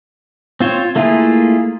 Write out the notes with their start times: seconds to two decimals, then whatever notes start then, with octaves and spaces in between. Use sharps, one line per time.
0.60 C4 F4 C5 C#5
0.96 A3 A#3 E4 F4 G#4